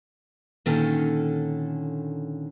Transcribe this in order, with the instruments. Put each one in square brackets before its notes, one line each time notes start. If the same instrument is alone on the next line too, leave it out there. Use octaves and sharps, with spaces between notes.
[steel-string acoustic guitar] A#2 D3 D#3 C#4 A4 A5